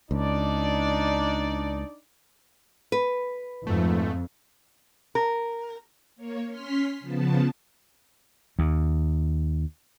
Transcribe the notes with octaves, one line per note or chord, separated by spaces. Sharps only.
C#2 D4 D#4 D5
B4
F2 G#2 A3
A#4
A#3 C#5
C#4 C6 F6 B6 C7
C#3 F3 B3 A5
D#2